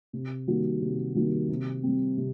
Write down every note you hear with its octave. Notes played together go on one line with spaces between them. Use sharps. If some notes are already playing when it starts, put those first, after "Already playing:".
C3
D#3 G3 A#3 F#4
C3
D#3 G3 A#3 F#4
C3
G3 C4
C3